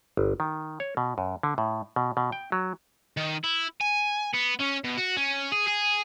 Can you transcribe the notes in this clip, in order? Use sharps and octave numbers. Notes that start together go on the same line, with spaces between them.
G1
D#3
C#5
B2
F#2
D3
A2
B2
B2
G5
F#3
D#3
E4
G#5
B3
C#4
B2
F#4
C#4
G#4
G#4